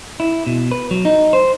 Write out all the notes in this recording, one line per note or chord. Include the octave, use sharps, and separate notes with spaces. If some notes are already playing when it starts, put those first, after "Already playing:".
E4
B2
B4
F#3
D#4
C5